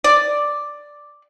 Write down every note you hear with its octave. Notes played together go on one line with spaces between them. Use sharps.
D5